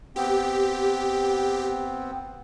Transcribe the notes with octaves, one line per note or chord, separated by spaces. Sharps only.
B3 C4 G4